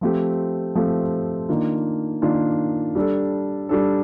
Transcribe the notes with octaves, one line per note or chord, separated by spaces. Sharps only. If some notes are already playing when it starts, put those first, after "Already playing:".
F3 A3 C4 G4
F3 A3 C4 G4
D#3 A#3 D4 F4
D#3 A#3 D4 F4
G3 D4 A4
G3 D4 A4